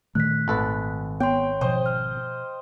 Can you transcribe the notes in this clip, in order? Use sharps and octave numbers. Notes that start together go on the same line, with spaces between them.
A#2 D#3 A3 F#6 B6
G#1 A4 B4
B3 C#5 G5 C6
B2 F3 C5 D#5
F6